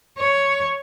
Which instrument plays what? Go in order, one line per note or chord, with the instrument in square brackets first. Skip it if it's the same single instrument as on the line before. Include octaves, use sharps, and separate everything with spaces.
[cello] C#5